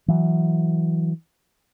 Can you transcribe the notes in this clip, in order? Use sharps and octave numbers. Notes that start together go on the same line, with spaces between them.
E3 F#3